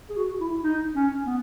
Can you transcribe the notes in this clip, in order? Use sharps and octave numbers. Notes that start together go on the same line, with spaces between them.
G#4
F#4
E4
D#4
C#4
B3